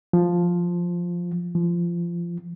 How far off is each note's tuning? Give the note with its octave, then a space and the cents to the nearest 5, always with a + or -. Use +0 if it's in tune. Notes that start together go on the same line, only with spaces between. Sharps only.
F3 +5
F3 -20